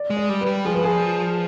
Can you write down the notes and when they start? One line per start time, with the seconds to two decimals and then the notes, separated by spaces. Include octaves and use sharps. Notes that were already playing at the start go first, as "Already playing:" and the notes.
Already playing: D5
0.10 G#3
0.17 D5
0.29 G3
0.41 B4
0.46 G3
0.65 F3 G#4
0.75 B4
0.84 G#4